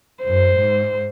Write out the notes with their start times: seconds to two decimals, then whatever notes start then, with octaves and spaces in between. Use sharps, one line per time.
0.23 F#2 C5
0.60 G#2